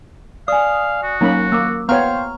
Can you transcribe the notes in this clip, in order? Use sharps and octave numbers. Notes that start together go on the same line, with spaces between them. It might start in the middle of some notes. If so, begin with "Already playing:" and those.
D5 F5 G#5 D#6
F#4
F#3 A#3 C#4 D#4 B5
A#3 D6 E6
B3 C5 C#5 F5 G5 A#5 C#6 F6